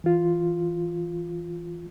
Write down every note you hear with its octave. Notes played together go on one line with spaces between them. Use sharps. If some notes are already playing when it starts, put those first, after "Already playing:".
E3 F4